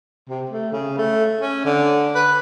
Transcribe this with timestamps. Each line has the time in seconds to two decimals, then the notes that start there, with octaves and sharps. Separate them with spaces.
0.29 C3
0.50 A3
0.72 C#3
0.98 A3
1.41 C#4
1.65 D3
2.15 B4